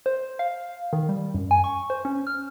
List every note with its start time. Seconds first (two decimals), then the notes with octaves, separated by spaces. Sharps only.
0.06 C5
0.39 F5
0.93 D#3
1.09 G3
1.34 F#2
1.51 G#5
1.64 C#6
1.90 C5
2.05 C#4
2.27 F6